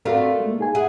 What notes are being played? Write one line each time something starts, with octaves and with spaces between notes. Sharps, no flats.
A3 C4 D4 F4 F#4 A#4
G#3 A#3
D#4 G#4 G#5
G#4 E5 F#5